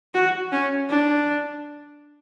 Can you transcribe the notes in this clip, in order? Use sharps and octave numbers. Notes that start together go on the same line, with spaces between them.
F#4
C#4
D4